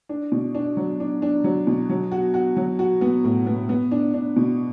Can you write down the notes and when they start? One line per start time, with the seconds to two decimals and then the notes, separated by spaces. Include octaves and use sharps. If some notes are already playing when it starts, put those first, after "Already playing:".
0.09 D4
0.32 B2
0.55 D4
0.77 F#3
1.00 D4
1.22 D4
1.44 F#3
1.67 B2
1.90 F#3
2.11 F#4
2.34 F#4
2.57 F#3
2.79 F#4
3.01 B3
3.24 A2
3.46 B3
3.69 B3
3.91 D4
4.14 D4
4.36 B2